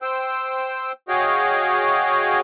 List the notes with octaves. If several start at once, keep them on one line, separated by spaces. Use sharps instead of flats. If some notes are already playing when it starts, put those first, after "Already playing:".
C5 G5 E6
F#4 G#4 C#5 D#5 F5 G5